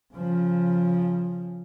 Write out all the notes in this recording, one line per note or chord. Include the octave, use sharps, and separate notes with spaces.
C#3 F3